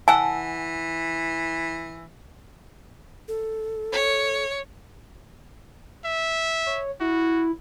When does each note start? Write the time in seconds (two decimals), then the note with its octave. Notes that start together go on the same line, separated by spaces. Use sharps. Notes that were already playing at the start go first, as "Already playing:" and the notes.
0.08 E3 A4 F#5 G#5
3.28 A4
3.92 C#5
6.05 E5
6.66 C#5
7.00 E4 F#4